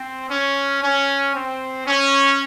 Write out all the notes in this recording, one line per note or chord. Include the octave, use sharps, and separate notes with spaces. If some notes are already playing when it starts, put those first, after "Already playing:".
Already playing: C4
C#4
C#4
C4
C#4